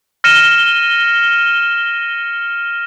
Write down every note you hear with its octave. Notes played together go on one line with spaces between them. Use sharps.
F6 A#6 C#7 D#7 E7 G7